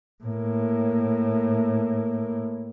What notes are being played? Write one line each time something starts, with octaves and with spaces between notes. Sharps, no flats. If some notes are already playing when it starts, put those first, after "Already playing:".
A2 A#3